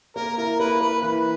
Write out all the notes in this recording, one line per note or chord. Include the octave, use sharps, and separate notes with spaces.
A#3 A#4
E4 A#4
A#3 B4
A#3 B4
E3 B4